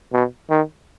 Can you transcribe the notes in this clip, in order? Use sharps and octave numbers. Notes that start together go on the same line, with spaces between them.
B2
D#3